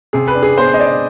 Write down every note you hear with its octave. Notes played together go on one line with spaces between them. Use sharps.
C3 G#4
B4
D4
G#4
B3 C5
D#5
D4 D5